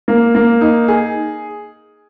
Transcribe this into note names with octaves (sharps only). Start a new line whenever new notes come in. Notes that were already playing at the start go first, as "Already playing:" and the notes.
A#3
A#3
D#4
G#4